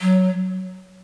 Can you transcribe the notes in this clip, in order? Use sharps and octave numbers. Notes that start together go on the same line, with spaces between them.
F#3